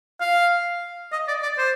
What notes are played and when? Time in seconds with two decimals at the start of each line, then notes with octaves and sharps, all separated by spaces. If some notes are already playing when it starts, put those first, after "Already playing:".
0.20 F5
1.12 D#5
1.28 D5
1.43 D5
1.58 C5